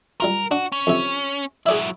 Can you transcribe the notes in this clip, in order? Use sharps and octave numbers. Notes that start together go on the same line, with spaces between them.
G3 F4 A#4 C6
D4 F#4
C#4
F2 C3
F#3 E4 G#4 D5 E5